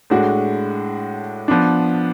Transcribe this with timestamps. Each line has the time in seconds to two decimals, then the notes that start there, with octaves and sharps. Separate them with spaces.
0.10 A2 G#3 D4 F#4
1.48 F3 B3 D4